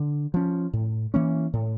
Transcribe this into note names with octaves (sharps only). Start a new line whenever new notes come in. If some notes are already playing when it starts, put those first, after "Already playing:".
Already playing: D3
F3 C#4
A2
E3 A#3 C#4
A2